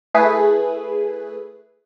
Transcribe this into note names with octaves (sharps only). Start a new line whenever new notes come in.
A3 E4 G#4 B4